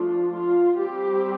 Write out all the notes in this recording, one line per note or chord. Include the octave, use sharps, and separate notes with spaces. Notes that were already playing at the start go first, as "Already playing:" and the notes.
Already playing: F3 A3 D4 F4
F4
G3 C4 G4